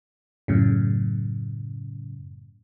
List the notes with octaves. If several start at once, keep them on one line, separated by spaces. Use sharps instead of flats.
F#2 A2 C#3